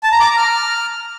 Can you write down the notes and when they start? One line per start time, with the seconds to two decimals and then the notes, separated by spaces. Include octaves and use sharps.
0.04 A5
0.12 A#5
0.20 D6
0.29 A#5
0.37 F6